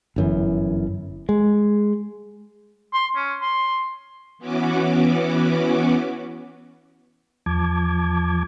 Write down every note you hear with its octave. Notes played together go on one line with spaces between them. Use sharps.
G1 F#2 E3
G#3
C6
C#4
C6
E3 B3 C#4 F#4 D6
E2 F3 A5 D6 G#6